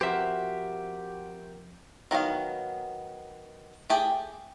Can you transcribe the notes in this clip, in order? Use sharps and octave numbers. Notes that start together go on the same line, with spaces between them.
F3 C4 F#4 G4 A#4 C5 E5
D#3 F#3 B3 F5
A3 G4 G#4